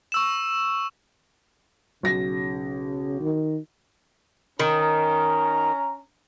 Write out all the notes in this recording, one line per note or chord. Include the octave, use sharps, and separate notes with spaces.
C#6 E6 E7
B1 C#3 A#6
D#3
D#3 C#4 A#5